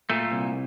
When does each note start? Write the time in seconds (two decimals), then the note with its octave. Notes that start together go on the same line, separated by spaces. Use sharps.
0.10 A#2 A3
0.32 C2